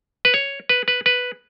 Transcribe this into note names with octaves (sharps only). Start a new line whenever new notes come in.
B4
C#5
B4
B4
B4